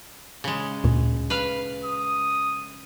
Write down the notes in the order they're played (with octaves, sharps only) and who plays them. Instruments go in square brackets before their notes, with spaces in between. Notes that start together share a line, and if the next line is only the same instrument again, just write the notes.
[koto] C#3 G#3
[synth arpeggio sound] D2 A#2
[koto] B4 F5
[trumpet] D#6